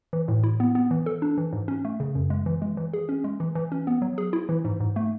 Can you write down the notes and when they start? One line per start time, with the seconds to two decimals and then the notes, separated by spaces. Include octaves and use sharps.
0.13 E3
0.28 A2
0.44 E4
0.60 B3
0.75 B3
0.91 E3
1.06 A4
1.22 D4
1.37 E3
1.53 G#2
1.68 C#4
1.85 A3
2.00 C#3
2.15 F#2
2.30 G#3
2.46 E3
2.62 G#3
2.77 E3
2.93 G#4
3.09 C#4
3.24 G#3
3.40 E3
3.55 E3
3.72 C#4
3.87 B3
4.02 F#3
4.18 G#4
4.33 E4
4.49 E3
4.65 G#2
4.80 G#2
4.96 A3